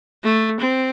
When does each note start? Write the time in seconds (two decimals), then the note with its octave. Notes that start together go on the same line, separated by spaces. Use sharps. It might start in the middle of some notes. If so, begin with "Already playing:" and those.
0.24 A3
0.60 C4